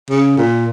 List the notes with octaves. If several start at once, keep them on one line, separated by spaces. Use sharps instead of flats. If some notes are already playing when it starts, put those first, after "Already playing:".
C#3
A#2